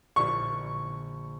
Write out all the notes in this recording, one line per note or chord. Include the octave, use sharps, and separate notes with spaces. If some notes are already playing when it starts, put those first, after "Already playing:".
A#1 A#2 D3 C#6